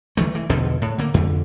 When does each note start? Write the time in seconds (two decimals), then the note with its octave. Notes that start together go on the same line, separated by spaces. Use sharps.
0.17 D#3 E3 G3 A3
0.35 E3
0.49 E2 B2 D3 F3
0.82 A2
0.98 D3 A#3
1.14 F2 D3